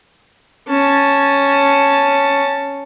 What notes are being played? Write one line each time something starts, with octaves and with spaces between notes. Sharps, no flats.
C#4 A5